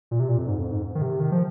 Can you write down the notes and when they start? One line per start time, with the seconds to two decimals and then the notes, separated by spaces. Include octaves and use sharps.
0.11 A#2
0.20 C3
0.29 A#2
0.38 F2
0.48 G#2
0.59 F2
0.72 G#2
0.95 D#3
1.02 C3
1.20 D#3
1.32 F3